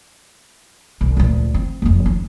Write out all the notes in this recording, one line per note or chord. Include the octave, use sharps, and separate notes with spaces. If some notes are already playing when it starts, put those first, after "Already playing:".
C2
D2 A#2
C4
F#1 F2
C#4 D#4